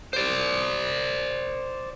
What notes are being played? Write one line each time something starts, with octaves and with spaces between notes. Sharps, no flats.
C5 D5